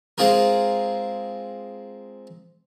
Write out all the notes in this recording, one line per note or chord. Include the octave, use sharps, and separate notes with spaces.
G#3 C4 F4 G#4 A#4